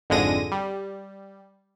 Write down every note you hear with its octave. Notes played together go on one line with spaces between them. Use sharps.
G#1 F2 D3 G#3 A#6 D#7
G3